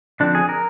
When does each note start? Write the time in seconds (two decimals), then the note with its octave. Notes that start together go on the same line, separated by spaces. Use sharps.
0.20 D3 F3 C4 D4
0.35 G#4
0.49 A#4